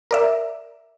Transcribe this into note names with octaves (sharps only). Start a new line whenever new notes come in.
A#4 D5 E5